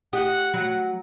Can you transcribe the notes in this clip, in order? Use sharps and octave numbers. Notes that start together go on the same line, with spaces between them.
G4 D#5 F#5
F#3